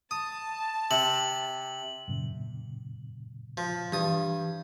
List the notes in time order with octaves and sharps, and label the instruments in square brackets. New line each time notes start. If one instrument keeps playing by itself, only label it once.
[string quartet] A5 [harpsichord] D#6
[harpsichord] C3 [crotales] F#7
[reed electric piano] F#2 A#2 C#3
[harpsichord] F3
[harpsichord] G2 D#6 [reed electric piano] E3